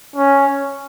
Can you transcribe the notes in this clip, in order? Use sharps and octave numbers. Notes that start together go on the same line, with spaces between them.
C#4